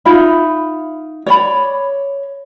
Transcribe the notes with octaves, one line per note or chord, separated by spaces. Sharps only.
D#4 F4 E5 B5
C#5 D5 B5